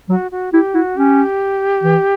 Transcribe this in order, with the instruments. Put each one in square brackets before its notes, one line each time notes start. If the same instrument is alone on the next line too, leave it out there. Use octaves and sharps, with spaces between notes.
[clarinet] F#3 [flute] F#4
[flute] F#4
[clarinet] E4 [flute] G4
[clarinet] E4 [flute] F#4
[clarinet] C#4 [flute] G4
[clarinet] E3